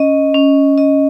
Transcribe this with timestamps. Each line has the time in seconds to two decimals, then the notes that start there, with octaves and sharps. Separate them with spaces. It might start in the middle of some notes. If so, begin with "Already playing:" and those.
Already playing: C#4 D#5
0.34 C#4
0.78 D#5